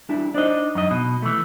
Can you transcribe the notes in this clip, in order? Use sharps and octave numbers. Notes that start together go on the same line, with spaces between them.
G3 D4 E4
D4 D#4 C5 D5 D#5
F#2 D#5
B2
E3 A3